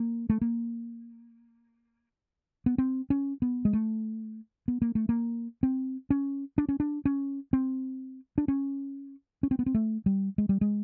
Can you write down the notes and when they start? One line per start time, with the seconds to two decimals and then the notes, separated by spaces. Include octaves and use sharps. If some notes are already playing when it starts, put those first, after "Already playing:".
Already playing: A#3
0.30 A3
0.41 A#3
2.66 B3
2.78 C4
3.10 C#4
3.42 B3
3.65 G#3
3.73 A3
4.68 B3
4.82 A#3
4.95 A3
5.09 A#3
5.63 C4
6.10 C#4
6.58 D4
6.69 C#4
6.80 D4
7.05 C#4
7.53 C4
8.38 D4
8.48 C#4
9.43 C#4
9.51 C4
9.59 B3
9.66 C4
9.75 A3
10.06 G3
10.38 G#3
10.49 G3
10.61 G#3